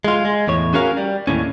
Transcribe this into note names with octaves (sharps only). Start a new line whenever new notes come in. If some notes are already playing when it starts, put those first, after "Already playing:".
G#3 F4
G#3
E2 A2 C#5
C#4 F#4 G#4 A#4 F5
G3
D#2 A2 C#4